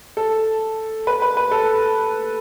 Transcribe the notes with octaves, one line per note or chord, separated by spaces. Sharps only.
A4
B4
B4
B4
A4